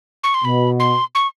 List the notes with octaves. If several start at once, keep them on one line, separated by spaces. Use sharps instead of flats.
C#6
C6
B2 B5
C6
C#6